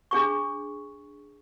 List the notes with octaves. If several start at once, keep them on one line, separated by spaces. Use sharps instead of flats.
D4 G#4 C#6